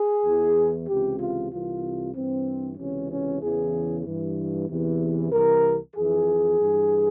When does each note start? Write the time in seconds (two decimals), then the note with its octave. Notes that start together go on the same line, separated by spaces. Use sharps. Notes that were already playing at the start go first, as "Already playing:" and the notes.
Already playing: G#4
0.24 E2 E3
0.87 C#2 C3 E3 G4
1.19 F4
1.50 C2 C3 E3 F4
2.15 G2 E3 C4
2.78 C#2 C3 E3 C#4
3.10 C#4
3.41 E2 C#3 E3 G#4
4.04 G2 E3
4.68 E2 C3 E3
5.32 C2 C3 E3 A#4
5.95 F2 E3 G#4
6.59 G2 E3